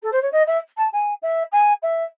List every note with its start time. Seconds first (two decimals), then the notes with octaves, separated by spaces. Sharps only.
0.02 A4
0.12 C5
0.22 C#5
0.32 D#5
0.46 E5
0.77 A5
0.92 G#5
1.22 E5
1.52 G#5
1.82 E5